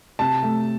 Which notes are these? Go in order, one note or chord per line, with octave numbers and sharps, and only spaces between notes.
C3 A5
A3